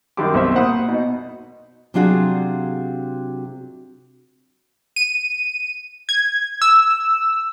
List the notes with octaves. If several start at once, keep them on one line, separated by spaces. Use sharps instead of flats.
F#2 D#3 G3 G4 C6 D6
B1 C4 C5 E5 C#6
A#2 C5 F#5 B5 D#6
B2 D#4
C3 F#3 D4 F4 F#4 G#4
D#7
G#6
E6